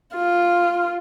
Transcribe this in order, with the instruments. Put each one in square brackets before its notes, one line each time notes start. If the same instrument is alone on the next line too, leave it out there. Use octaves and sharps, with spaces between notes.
[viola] F4